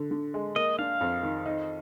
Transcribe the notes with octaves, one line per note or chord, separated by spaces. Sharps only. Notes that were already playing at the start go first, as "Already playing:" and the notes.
Already playing: D3
D3
G#3
A#3 D#5
D4 F5
F2
D#3
D#4